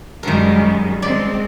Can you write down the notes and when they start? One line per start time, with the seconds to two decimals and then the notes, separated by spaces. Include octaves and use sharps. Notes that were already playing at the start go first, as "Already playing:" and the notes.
0.23 F#2 D#3 G3 G#3 A#4
1.02 G#3 C4 D5